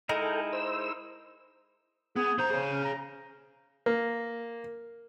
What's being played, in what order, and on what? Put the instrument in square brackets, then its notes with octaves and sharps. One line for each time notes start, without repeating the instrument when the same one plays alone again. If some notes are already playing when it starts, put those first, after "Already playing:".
[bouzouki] G#3 [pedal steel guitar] D#4 E4 A#4 [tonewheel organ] A4 G5
[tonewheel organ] C5 E6
[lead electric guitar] B3 [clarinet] G#4
[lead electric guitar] D3 A#5 [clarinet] C5
[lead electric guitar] G#4 C#5
[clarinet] C#4
A#5
[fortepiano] A#3